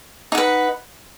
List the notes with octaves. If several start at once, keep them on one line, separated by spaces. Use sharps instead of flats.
D#4 B4 F#5